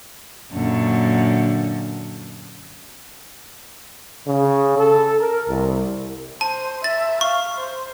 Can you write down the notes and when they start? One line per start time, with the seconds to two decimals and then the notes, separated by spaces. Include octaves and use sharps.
0.53 F#2 A#2 D3
4.27 C#3
4.76 A4
5.20 A#4
5.48 C2
6.41 C5 A5
6.84 E5 A6
7.21 F5 C#6
7.57 C5